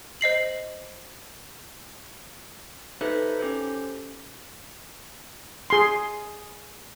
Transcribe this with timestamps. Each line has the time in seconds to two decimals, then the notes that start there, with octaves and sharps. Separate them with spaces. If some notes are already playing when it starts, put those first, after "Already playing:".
0.21 C5 D#5 C7 F#7
3.01 D#4 G4 A4 B4 C5 E5
3.40 C#4 G4 A4 C5
5.70 G#4 C6